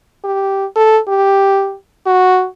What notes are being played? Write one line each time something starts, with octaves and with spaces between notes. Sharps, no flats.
G4
A4
G4
F#4